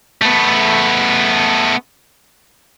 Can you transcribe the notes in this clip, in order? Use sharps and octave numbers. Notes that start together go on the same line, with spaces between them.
A3 B3